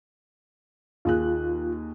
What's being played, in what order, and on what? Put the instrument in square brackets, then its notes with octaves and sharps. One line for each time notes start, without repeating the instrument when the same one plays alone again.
[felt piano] D#2 G#4 F#6 [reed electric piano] F4